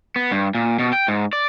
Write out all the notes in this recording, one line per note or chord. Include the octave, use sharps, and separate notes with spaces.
B3
G2
A#2
B2
G5
G#2
D5